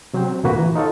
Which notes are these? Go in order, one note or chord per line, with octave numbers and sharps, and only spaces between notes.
C3 F#3 C#4 C5 G5
C4
D2 G2 A#2 A#3 F#4 B4
E3
D#4 F4 A4 C#5